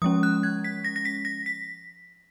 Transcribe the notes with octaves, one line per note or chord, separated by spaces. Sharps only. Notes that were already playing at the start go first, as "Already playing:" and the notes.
F3 G#3 C#4 D#6
F#6
G#6
B6
A#6
A#6
B6
A#6
B6